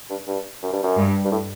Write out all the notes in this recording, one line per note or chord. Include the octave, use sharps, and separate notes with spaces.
G2
G2
F#2
G2
F#2
G2
G2
A2